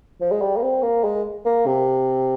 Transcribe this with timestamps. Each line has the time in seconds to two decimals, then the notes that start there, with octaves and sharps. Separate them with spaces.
0.21 F3
0.32 G#3
0.41 G3
0.57 A#3
0.62 C4
0.82 A#3
1.04 G#3
1.45 A#3
1.66 C3